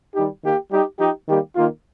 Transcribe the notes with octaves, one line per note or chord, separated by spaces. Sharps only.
D#3 G3 D#4 G4
D#3 A#3 G4
G3 D#4 G4
F3 D#4 G4
D#3 G3 A#3 G4
D#3 A#3 F4